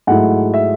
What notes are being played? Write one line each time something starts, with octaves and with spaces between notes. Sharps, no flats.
G#2 F#3 A3 E4 F#5
E5